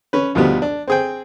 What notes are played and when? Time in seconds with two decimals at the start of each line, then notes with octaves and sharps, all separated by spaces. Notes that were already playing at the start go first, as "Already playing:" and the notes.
0.13 C#4 B4
0.35 D2 B2 F3 G3 B3
0.62 D4
0.88 C4 G#4 G5